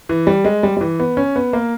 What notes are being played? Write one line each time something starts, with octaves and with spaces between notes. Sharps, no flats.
E3
G3
G#3
G3
G3
E3
B3
C#4
B3
A#3